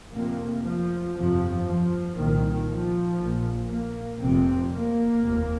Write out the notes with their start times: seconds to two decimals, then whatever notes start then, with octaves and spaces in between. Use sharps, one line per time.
0.12 F1 F2 C3 A#3
0.63 F3
1.15 G1 F2 C3 F3
1.65 F3
2.16 C2 A#2 D#3
2.67 F3
3.17 A#1 A#2
3.69 A#3
4.19 F1 F2 C3 C4
4.70 A#3
5.21 F1 D#2